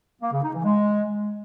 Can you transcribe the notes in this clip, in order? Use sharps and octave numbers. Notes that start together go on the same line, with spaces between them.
A#3
C#3
D#4
E3
G#3